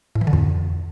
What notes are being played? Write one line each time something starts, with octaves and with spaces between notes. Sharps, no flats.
A2
E3
D3
F2